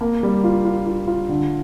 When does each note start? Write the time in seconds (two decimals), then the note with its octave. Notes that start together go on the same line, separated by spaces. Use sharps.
0.01 A#3
0.23 G3
0.44 F4
0.65 F4
0.87 F4
1.07 F4
1.29 D3